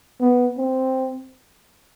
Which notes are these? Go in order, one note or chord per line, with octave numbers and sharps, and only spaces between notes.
B3
C4